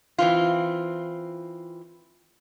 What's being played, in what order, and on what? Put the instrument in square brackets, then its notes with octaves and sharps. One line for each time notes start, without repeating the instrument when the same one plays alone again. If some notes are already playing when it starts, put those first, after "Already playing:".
[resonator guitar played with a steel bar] E3 C4 F4